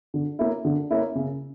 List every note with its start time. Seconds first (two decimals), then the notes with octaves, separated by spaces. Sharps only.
0.14 D3
0.39 A#3 C#4 E4
0.65 D3
0.91 A#3 C#4 E4
1.15 C#3